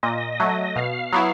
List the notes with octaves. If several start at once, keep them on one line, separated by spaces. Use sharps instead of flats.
A#2 D#5
F#3 A3
B2 F5
F#3 B3 E4